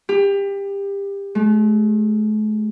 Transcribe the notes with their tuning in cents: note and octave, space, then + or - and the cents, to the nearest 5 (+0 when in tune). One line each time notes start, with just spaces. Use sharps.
G4 +25
A3 -45